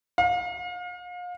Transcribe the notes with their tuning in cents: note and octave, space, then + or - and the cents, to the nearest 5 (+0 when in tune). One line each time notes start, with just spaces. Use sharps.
F5 +35